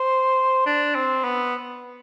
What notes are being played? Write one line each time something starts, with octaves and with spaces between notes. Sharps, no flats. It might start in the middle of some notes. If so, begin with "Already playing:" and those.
Already playing: C5
D4
C4
B3